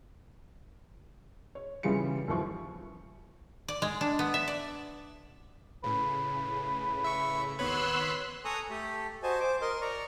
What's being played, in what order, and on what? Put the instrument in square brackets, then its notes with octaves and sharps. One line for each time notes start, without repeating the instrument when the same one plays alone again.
[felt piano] C#5
C#3 E3 G3 F4 C#7
D#2 E3 F3 C#6
[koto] D5
G#3
D4
B3
E5
D5
[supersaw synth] A2 C#3 [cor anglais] B4
[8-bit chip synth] E5 C#6
[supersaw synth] D#2 B3 C#5 [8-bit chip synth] B4 B5 [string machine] C6 E6 F#6
[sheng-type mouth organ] A4 G#5 A#5 C#6 D#6
A3 G4 A4
F#4 C5 D#5 G#5 A5
C5 D6
A#4 D#5 C6
A#4 D5 A#5 C#6